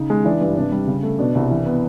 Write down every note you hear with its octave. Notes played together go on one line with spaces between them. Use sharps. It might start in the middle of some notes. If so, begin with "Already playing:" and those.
Already playing: C#3 D#4
G#3
E3 D4
G2
C3 D4
G3
C#3
A3
B2 D4
C2
E3
B3